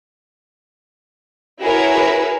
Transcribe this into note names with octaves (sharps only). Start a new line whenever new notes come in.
E4 F#4 G#4 A#4 B4 C#5